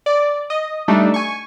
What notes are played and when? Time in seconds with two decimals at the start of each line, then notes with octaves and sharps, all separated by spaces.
0.06 D5
0.50 D#5
0.88 G3 A3 D4 D#4 A4
1.14 G#5 C#6